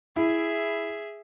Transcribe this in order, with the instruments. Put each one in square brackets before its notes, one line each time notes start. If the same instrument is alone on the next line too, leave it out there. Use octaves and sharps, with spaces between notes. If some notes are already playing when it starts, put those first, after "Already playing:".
[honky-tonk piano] E4 [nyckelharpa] G#4 E5